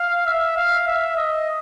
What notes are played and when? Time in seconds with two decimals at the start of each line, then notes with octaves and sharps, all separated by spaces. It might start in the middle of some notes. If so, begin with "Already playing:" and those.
Already playing: F5
0.26 E5
0.56 F5
0.87 E5
1.17 D#5